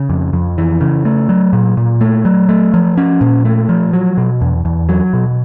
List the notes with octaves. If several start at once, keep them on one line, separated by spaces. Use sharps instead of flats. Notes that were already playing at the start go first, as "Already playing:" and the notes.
Already playing: C#3
F2
F2
E3
C#3
A3
F#3
A#2
A#2
A3
F#3
A3
F3
C#4
A#2
A3
F3
F#3
B2
E2
E2
F#3
B2